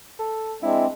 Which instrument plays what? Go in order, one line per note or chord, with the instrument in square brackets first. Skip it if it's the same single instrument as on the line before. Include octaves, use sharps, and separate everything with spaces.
[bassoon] A4
[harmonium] G#3 C4 D4 [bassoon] E4